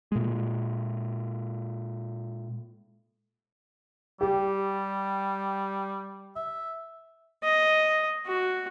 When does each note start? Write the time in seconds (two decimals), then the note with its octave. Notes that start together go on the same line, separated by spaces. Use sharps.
0.12 A#2 G#3
4.21 G3 G4
6.36 E5
7.44 D#5
8.26 F#4